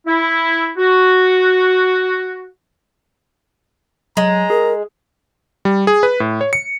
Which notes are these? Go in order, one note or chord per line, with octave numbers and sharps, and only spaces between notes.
E4
F#4
F#3 G#3 A#5
G#4 A#4
G3
G#4
B4
A2
C#5
C#7